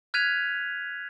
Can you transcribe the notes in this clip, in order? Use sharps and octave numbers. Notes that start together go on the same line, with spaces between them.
F6 F#6 G#6 B6 D#7 F7